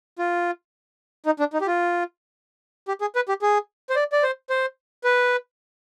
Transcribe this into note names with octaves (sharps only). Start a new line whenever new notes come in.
F4
D#4
D4
D#4
G4
F4
G4
G#4
B4
G4
G#4
C5
D5
D5
C5
C5
B4